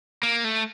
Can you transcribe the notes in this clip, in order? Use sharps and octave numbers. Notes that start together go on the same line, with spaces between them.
A#3
A3